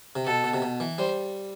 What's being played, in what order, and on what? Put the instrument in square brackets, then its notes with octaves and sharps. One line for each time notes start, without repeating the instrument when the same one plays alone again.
[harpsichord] C3
[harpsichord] B2 [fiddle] A4
[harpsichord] B2
C3
B2
E3
[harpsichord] G3 [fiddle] C5